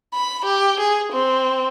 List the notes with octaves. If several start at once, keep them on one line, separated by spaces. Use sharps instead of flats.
B5
G4
G#4
C4